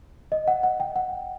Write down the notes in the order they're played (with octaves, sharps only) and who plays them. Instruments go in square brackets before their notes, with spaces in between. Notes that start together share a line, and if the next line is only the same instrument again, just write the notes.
[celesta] D#5
F#5
F#5
G5
F#5